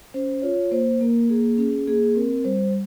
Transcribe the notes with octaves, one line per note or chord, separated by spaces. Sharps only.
C#4 C5
F4 C#5
A#3 C5
A#3 A#4
A#3 G#4
C#4 G#4
A#3 G#4
C4 A#4
G3 C5